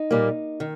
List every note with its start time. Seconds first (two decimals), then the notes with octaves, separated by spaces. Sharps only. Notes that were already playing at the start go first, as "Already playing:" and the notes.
Already playing: D#4
0.11 A#2 G3 A#3
0.60 D#3